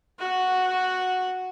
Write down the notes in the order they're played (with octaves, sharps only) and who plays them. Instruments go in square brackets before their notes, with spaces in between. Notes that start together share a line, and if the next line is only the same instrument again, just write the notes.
[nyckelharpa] F#4 F#5